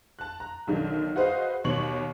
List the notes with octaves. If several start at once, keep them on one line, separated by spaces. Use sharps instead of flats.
A5 F#6
A#5
B1 D3 D#3
F#4 G#4 B4 C5 D#5 F5
D#2 B2 C#5 C#6 F#7